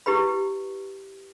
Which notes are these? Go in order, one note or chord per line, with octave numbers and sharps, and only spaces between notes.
E4 G4 B4 B5